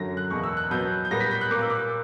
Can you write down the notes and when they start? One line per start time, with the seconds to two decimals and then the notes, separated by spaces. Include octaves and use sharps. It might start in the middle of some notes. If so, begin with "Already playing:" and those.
Already playing: F#2 D3 F#3 A#6
0.17 F#6
0.30 E2 B2 A#3 C#6
0.44 E6
0.57 F#6
0.70 B2 F#3 B3 G6
1.05 G6
1.11 A#2 G3 B3 A#6
1.20 B6
1.31 G6
1.41 F#6
1.51 A#2 A#3 D6
1.61 E6
1.70 D6